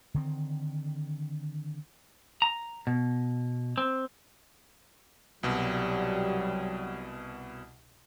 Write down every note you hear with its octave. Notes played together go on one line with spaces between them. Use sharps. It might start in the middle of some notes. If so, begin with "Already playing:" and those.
D3 D#3 C4
A#5
B2
C4
C2 B2 F#3 G3